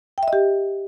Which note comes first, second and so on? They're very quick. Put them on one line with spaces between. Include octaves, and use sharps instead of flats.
G5 E5 D#5 G4